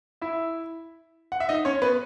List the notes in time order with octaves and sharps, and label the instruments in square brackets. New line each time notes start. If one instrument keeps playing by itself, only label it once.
[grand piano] E4 E5
F#5
E5
D#4 D#5
C#4 C#5
B3 B4